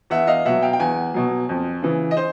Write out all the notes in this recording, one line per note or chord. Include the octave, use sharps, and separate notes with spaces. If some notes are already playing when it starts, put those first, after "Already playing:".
E2 E5 F#5
D#5 F5
B2 F#3 E5 F#5
F5 G5
G5
E2 F#5 G#5
B2 F#3
F2
C#3 E3
D#5
C5